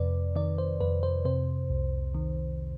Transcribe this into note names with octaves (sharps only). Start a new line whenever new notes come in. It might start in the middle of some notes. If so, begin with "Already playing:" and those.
Already playing: F2 C3 B4 D5
D#3 D5
C5
F2 B4
C5
C3 C5
C2
D#3